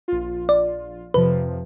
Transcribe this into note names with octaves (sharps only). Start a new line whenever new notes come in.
A#1 F4
D5
F2 C3 F3 B4